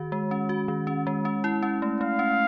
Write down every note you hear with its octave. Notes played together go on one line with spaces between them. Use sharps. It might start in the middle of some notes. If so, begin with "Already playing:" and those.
Already playing: D#3 F#4
G#3
C#4
F#4
D#3
C#4
G#3
C#4
E4
C#4
A3
A3 F5
C#4